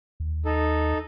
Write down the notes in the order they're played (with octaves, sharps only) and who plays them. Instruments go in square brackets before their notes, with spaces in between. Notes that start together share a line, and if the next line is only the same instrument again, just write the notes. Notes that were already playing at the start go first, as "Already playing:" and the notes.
[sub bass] D#2
[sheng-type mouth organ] D#4 A4